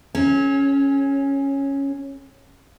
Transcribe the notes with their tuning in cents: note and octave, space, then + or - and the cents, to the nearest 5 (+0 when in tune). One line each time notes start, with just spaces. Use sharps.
C#4 -5 A4 -45